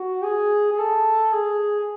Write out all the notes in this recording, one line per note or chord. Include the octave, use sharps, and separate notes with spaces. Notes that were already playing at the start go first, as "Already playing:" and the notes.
Already playing: F#4
G#4
G#4
A4
G#4